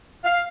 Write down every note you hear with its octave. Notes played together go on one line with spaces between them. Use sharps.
F5